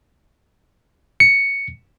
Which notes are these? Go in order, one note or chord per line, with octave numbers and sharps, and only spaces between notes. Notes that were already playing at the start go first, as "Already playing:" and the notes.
C#7